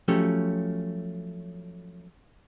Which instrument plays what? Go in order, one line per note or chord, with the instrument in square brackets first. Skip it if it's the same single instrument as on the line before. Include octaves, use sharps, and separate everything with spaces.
[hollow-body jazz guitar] F3 F#3 A3 C#4 G4